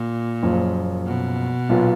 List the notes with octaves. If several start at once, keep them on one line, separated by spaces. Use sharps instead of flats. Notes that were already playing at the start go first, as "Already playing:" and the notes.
Already playing: A#2
F#1 F#2 F3
B2
B1 A#2 F#3 B3 F4